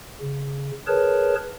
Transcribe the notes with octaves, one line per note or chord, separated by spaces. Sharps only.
C#3
G#4 A#4 B4 C#5 A5